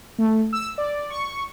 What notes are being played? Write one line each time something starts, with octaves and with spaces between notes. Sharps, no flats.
A3
E6
D5
C#6